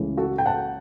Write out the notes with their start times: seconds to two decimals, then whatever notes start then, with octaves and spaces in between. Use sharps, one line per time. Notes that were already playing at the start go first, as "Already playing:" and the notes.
Already playing: C#2 C#3 E3 A3
0.17 F#4 A4
0.38 G5
0.46 F#5 A5